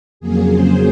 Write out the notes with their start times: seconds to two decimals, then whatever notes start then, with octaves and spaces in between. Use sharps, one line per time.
0.20 F2 C#3 F#3 A#3 G#4
0.52 C5